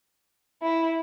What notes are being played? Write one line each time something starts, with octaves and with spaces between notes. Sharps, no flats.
E4